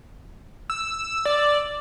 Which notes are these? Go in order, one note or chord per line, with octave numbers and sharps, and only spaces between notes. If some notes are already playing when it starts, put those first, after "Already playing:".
E6
D5